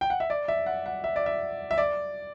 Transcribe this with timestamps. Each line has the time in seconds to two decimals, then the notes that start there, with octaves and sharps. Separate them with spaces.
0.01 G5
0.10 F#5
0.20 E5
0.30 D5
0.48 E5
0.66 F#5
0.86 F#5
1.04 E5
1.16 D5
1.26 E5
1.71 E5
1.78 D5